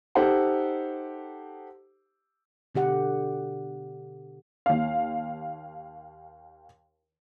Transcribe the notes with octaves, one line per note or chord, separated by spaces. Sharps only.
D#4 G4 A4 C5 F#5
B2 D3 G4 F#5
D#2 F5